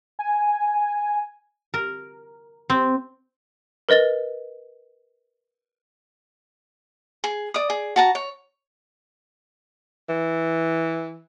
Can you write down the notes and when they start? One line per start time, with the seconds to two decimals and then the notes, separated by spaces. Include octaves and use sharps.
0.19 G#5
1.74 A#4
2.70 C4
3.89 A#4 B4 D#5 A6 G7
7.24 G#4
7.54 D5 D#6
7.70 G#4
7.96 F#4 A5 A#5
8.15 C#5
10.09 E3